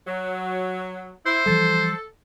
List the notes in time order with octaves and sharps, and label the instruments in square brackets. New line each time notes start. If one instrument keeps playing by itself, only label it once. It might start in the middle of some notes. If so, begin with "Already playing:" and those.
[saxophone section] F#3
[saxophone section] E4 [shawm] C5
[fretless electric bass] E3 F3 G3 [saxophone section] A4